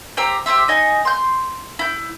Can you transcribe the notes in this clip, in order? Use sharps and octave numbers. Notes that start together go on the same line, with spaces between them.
G4 C5 A#5 E6
G4 G#4 C5 E5
D#4 D#5 G#5
C6 G6
E4 G6